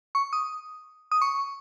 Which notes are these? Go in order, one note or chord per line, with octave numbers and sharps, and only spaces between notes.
C#6
D#6
D#6
C#6